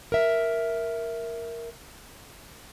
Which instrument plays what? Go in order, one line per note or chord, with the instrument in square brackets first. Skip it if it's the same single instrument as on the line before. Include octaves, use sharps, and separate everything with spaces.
[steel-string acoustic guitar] A#4 E5